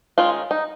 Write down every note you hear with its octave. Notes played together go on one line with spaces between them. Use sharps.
D#3 G#3 C#4 F4
D#4